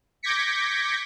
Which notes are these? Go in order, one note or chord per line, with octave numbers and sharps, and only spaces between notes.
D6 G6 G#6 A#6 B6 C#7